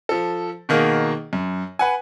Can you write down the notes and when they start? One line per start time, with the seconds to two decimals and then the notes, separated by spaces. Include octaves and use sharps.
0.09 F3 A4
0.69 B2 D#3 A#3 F#4 G#4
1.33 F#2
1.79 B4 F#5 G#5